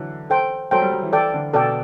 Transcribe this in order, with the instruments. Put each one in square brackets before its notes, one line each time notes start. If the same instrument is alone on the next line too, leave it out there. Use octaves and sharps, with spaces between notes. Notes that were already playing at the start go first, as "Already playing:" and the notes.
Already playing: [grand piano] D3 E3 F#3
[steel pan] A4 C5 G5
[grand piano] F#3 [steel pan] A4 C5 G5
[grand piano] G3
F#3
E3
[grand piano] E3 [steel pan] A4 D5 G5
[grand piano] D3
[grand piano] B2 [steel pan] A4 D5 G5